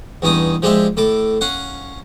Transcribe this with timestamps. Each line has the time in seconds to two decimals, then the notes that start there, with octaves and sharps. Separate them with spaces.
0.22 E2 G2 C#4 D#4 D#6
0.62 F3 G#3 D4 G4 E5
0.97 A2 A4 D6
1.41 C#4 F5 F#5